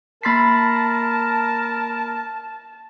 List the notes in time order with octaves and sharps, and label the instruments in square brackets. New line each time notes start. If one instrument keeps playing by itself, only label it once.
[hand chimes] A#3 C6 C7 [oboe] A#4 [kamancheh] A5 [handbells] B5 A6 B6